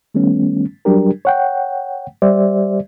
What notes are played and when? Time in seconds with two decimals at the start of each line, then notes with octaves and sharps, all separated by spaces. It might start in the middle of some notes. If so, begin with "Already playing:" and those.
0.14 D#3 G3 A3 B3 C#4
0.85 F#3 G3 D4 G4 A#4
1.25 C#5 F#5 G5
2.22 G3 G4 C5 D5 E5